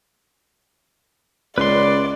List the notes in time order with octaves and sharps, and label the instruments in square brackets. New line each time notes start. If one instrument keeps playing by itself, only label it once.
[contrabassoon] C#2 [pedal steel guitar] B4 C6 [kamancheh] D5